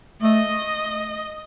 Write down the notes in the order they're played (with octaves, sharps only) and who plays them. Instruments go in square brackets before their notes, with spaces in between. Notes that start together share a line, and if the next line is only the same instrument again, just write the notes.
[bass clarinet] A3 [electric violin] D#5